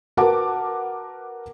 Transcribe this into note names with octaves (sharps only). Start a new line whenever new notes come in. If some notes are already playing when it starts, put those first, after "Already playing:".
F#4 A#4 B4 F#5 A5 D6